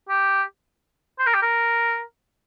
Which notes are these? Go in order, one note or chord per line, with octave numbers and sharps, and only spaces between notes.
G4
C5
A#4
G4
A#4